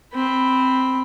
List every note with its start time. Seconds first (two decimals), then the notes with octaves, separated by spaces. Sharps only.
0.14 C4 B5